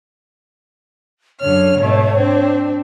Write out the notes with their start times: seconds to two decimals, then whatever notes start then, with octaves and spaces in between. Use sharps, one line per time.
1.41 F#2 D3 C#5 F6
1.79 G#2 B2 A3
2.17 C4 D4